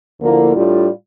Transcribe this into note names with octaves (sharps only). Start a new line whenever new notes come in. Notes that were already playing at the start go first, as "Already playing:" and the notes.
D2 D3 F3 A#3 E4
A2 G3 D4 F4